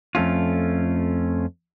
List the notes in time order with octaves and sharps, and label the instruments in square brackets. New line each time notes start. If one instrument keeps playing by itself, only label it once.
[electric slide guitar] F2 A3 C#4 F4